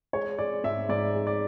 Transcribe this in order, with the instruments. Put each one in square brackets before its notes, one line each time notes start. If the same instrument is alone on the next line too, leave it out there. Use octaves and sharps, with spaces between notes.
[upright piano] G#3 C#5
G#3 D5
G#2 E5
G#2 D5
G#3
D5